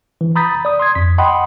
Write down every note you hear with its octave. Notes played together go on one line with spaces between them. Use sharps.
E3
A#5 B5 D#6 G6 A6 B6
D5 D#6
C6 D#6 G#6
F2 B6
D#5 F#5 G5 B5 C6 D#6